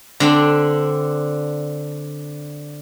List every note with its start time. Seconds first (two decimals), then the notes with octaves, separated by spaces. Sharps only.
0.20 D3 C4 D4